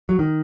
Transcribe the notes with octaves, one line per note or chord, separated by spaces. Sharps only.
F#3
D#3